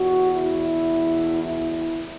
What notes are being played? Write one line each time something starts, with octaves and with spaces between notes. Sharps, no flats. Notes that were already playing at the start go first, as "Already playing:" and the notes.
Already playing: E2 B2 F#4
E4
E4